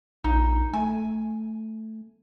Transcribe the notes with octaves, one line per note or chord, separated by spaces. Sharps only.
A#1 D#4
A3 G#5